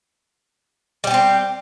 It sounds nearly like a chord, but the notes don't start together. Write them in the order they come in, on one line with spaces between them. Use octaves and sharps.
G3 G4 B3 C4